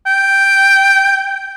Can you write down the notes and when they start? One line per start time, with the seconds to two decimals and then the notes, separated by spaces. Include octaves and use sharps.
0.06 G5